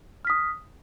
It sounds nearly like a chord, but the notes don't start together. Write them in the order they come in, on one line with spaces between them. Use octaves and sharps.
F6 B6 D#6